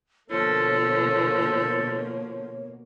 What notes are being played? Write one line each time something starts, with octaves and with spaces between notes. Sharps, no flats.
B2 D3 F3 A#3 A4 C#5